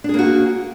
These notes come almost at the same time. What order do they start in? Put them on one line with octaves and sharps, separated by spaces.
D4 G#4 A#3 F#4